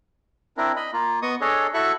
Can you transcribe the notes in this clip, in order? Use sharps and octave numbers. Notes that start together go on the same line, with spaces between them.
C4 D4 E4 A#4
D#5 B5
A#3 F4
B3 D#5 C#6 D#6
D4 G#4 A4 C#5 D#5
E4 F#4 A4 E5 C#6 F#6